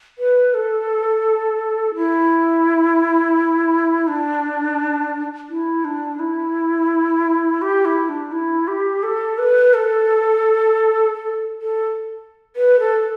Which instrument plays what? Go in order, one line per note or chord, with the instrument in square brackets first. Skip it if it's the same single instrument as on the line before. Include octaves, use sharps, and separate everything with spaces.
[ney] B4
A4
E4
D4
E4
D4
E4
G4
E4
D4
E4
G4
A4
B4
A4
A4
A4
B4
A4